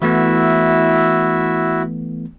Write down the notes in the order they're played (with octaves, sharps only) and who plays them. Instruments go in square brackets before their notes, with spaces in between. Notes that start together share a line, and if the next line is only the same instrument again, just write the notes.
[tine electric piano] E3 A3 B3 [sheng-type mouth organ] E4 F#4 E5